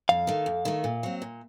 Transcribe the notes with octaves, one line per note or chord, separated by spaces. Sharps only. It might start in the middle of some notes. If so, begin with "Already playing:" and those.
F2 F5
D#3 A3
F2
D#3 A3
A#2
F#3 C4
A#2